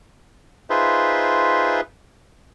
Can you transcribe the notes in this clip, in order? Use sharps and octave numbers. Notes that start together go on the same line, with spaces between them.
D#4 F4 G#4 B4 C5 E5